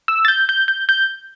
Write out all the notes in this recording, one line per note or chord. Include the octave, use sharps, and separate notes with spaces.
E6
A6
G6
G6
G6
G6